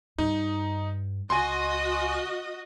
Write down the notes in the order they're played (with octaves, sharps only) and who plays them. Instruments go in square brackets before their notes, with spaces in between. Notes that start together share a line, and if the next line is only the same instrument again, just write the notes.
[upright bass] G2 [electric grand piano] D#4
[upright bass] C#2 [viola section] F#4 D#5 [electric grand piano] G#5 C6